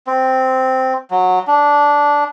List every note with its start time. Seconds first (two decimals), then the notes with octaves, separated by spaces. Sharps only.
0.07 C4
1.11 F#3
1.47 D4